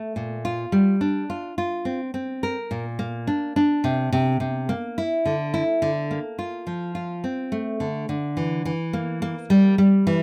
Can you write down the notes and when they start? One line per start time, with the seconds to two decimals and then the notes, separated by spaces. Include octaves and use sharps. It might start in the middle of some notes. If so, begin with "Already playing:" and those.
Already playing: A3
0.16 A#2
0.45 F4
0.72 G3
1.01 D4
1.30 F4
1.58 F4
1.85 C4
2.14 C4
2.43 A#4
2.71 A#2
2.99 A#3
3.27 D4
3.56 D4
3.84 C3
4.13 C3
4.40 C3
4.69 A#3
4.98 E4
5.26 D3
5.54 E4
5.82 D3
6.11 A#3
6.39 F4
6.67 F3
6.95 F4
7.24 C4
7.52 A3
7.80 D3
8.09 D3
8.37 E3
8.65 E3
8.93 A#3
9.22 A#3
9.50 G3
9.78 G3
10.07 E3